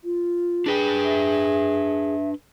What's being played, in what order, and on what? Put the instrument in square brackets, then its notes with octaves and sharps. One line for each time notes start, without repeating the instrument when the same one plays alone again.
[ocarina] F4
[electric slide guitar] D4 B4 G5 [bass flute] G#4
[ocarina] E5